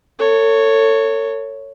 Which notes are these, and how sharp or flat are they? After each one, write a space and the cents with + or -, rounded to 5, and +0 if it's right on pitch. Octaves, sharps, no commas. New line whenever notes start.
A4 +40 C#5 +0